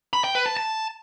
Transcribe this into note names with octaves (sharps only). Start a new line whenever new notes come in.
B5
G5
B4
A5
A5